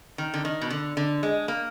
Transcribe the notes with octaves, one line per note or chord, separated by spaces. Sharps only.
D#3
D3
D#3
B2
D3
D3
G#3
A#3